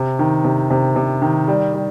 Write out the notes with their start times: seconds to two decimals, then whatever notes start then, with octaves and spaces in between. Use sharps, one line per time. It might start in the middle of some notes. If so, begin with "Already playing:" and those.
Already playing: C3
0.19 D#3
0.44 C3
0.70 C3
0.96 C3
1.22 D#3
1.48 G3
1.74 G3